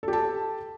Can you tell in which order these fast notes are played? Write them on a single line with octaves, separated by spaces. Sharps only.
A4 G4 A5